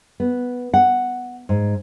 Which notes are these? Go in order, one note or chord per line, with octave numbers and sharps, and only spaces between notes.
B3
F#5
G#2